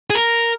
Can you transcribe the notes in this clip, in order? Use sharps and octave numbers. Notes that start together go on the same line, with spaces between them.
G#4
A#4